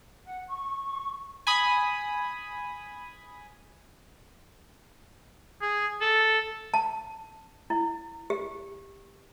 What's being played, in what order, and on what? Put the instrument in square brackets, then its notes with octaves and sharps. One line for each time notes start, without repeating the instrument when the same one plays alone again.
[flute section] F#5
C#6
[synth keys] G#5 B5 D#6
[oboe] G#4
A4
[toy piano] A5
E4
G4